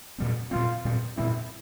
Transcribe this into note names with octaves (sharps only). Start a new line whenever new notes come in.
A#2 G3 C4
A#2 G3 C4 F4
A#2 G3 C4
A#2 G3 C4 E4